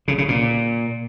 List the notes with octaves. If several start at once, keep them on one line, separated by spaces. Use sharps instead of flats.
C#3
C#3
A#2